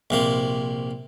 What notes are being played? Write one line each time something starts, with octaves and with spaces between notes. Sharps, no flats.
A#1 C3 A#3